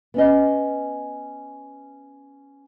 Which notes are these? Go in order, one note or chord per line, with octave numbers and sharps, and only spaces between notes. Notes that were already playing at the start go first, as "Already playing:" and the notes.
B3 C#4 D#5